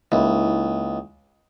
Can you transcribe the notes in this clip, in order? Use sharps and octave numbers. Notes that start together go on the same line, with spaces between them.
C#2 A#3 D#4 E4